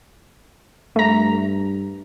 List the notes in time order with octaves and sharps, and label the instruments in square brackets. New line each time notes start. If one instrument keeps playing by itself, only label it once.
[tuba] G2 [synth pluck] A3 A#5